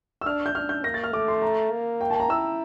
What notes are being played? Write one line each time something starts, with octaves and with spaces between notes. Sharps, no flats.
E6
D4 F6
G6
D4 F6
G6
A#3 A#6
A6
F6
A3 D6
C6
A#5
A#3
G5
A5
A#5
E4 E6